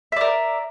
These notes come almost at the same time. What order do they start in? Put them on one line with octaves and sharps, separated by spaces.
E5 D5 A#4